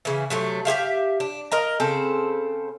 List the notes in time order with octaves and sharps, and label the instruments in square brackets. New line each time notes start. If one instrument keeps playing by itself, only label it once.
[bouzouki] C#3 E3
C3 F#3 A3
G4 G#4 E5 F5
D4
A#4 D#5 A#5
C#3 C4 A4 C5